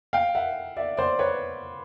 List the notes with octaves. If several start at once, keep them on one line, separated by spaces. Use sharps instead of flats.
F5 G5
E5 F#5
D5 E5
C5 D5
B4 C#5